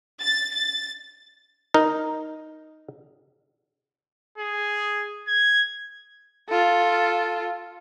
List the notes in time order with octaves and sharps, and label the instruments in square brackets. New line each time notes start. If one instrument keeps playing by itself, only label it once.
[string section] A6
A6
[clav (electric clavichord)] D#4 A#4
[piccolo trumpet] G#4
G#6
[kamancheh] F4 A4